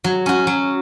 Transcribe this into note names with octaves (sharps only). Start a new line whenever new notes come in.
F#3
C#4 F#4
F#3